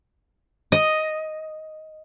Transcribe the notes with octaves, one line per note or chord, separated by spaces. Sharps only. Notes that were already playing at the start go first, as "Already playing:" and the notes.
D#5